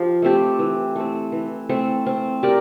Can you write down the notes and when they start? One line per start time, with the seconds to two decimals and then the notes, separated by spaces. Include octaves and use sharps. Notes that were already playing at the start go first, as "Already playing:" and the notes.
Already playing: F3 G4
0.22 A3 C4 G4
0.59 E3
0.96 A3 C4
1.32 E3
1.69 A3 C4
2.06 C4
2.43 G4 A#4 D5